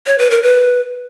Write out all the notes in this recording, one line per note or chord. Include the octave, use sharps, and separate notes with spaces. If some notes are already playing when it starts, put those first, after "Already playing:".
C#5
B4
A#4
B4